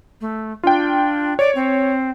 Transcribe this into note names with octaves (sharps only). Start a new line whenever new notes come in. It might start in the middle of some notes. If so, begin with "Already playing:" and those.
A3
D4 F4 G5
C#5 D5
C4